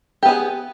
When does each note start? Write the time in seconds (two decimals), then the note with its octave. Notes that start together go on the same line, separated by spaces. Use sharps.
0.23 G4
0.25 B3
0.28 G#4